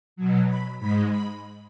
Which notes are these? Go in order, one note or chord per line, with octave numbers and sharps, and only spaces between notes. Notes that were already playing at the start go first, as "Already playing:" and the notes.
B2 F#3
B5
G#2 G#3 B5
B5